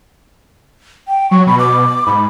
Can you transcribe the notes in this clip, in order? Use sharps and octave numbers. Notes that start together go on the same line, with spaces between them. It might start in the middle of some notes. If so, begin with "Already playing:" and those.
G5
F#3 C#6
B2 B5
D6
G#2 B5